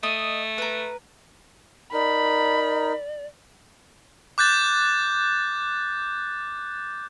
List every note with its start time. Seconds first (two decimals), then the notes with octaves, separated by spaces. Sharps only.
0.03 A3 D#5
0.58 A#4 B4
1.93 D#4 A#4 D5 B5
4.38 D6 F#6 G6 A6